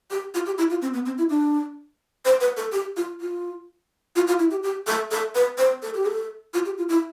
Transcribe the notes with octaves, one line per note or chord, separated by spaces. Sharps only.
G4
F4
G4
E4
F4
C4
B3
C4
E4
D4
C5
B4
A4
G4
F4
F4
F4
F4
E4
G4
G4
A4
A4
B4
C5
A4
G4
A4
F4
G4
F4
E4